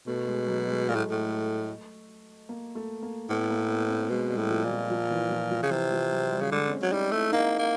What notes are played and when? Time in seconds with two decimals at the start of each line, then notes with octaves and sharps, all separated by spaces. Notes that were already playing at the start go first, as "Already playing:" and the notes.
0.07 B2 A3
0.27 G#3
0.48 F#3
0.68 G#3
0.88 A#2 A3
0.95 A2
1.11 A2
2.49 A#3
2.75 A3
3.03 A#3
3.30 A2 B3
3.50 A#3
3.70 B3
3.90 C4
4.09 B2 G#3
4.30 G3
4.37 A2
4.50 F3
4.64 A#2
4.70 F3
4.90 F3
5.11 E3
5.30 F3
5.50 F3
5.63 C#3
5.71 C3 E3
5.91 F3
6.12 F#3
6.32 G3
6.41 C#3
6.51 D3 G#3
6.67 C4
6.72 C#4
6.82 F#3
6.92 G3 D#4
7.12 A3 E4
7.32 A#3 D#4
7.59 A#3